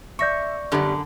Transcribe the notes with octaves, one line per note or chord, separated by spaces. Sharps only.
D5 E5 C#6 G6 A#6 C#7
F#2 D3 G3 B3